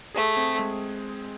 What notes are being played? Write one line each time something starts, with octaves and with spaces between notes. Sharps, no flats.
A3 G#4
C4
G#3